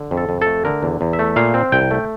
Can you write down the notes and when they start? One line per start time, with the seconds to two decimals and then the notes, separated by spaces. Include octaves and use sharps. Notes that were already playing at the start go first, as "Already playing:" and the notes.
Already playing: D3
0.11 F2
0.17 A4
0.29 F2
0.41 A4
0.47 A3
0.65 D3 A#4
0.83 E2
1.01 E2
1.13 E5
1.19 A3
1.36 A#2 F5
1.54 C4
1.72 C2 G5
1.91 A3